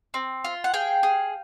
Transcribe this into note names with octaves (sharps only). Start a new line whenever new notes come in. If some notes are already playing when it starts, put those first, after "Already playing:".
C4
F4
F#5
G#4 F5 G5
G#4